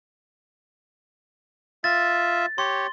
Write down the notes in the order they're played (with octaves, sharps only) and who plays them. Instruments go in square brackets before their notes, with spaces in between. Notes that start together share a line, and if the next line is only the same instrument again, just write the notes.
[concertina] F4 E5 [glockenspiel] A6
[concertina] G4 C#5 [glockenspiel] C6